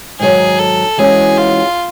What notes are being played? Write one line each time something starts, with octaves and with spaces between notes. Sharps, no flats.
G#2 D#3 F#3 G#4
A4
E3 G#3 C#4 F#4 G#4
F4